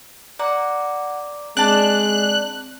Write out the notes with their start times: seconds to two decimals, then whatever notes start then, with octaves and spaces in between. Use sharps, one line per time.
0.39 D5 F#5 A#5 D6
1.57 G#3 C4 D4 D5 A5 F#6